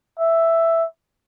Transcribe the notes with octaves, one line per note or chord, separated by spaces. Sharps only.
E5